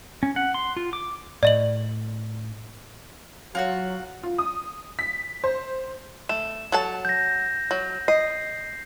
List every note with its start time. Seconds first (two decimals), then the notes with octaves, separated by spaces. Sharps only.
0.23 C#4
0.36 F#5
0.54 C6
0.77 F4
0.93 D6
1.43 A2 D5 D#5 F#7
3.55 F#3 F4 F#4 F#5
4.23 F4
4.38 D#6
4.99 B6
5.44 C5
6.29 A3 E7
6.72 F#3 A4 A5
7.05 G6 A#6
7.71 F#3
8.08 D#5 C7